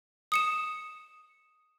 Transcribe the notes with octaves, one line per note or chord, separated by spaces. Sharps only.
D#6 C#7 E7